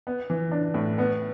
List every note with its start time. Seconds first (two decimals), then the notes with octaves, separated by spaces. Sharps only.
0.07 B3
0.30 E3
0.52 D4
0.74 A2
0.98 B3